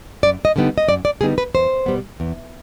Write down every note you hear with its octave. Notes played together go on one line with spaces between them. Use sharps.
F#2 D5
D#5
D3 G3 B3 D#4
D#5
F#2 D5
D5
D3 G3 B3 D#4 G#4
B4
E2 C5
B2 G3 B3
E2